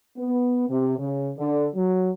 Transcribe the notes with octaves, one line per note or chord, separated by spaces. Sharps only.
B3
C3
C#3
D3
F#3